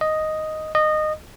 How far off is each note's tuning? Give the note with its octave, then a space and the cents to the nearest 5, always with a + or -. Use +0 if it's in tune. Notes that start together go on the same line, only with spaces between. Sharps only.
D#5 +0
D#5 -20